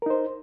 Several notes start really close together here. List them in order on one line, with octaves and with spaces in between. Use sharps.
A#4 D#4 C5